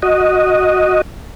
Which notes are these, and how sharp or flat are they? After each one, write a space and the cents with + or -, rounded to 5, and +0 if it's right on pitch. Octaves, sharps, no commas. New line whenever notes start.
F#4 -10 D#5 +0